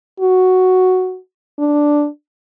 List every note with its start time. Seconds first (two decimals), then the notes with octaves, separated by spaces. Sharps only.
0.20 F#4
1.58 D4